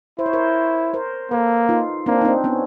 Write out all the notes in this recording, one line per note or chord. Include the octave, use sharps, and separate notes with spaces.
E4 C5
C#5
A#4 C5
A#4 C5
A#3 A4 B4
D#4 F4
A#3 C4 D4
D#4
C4 D4
B3 C#4